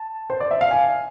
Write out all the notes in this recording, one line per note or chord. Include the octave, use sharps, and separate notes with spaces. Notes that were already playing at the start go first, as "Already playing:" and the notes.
Already playing: A5
C5
D5
E5
F5
G#5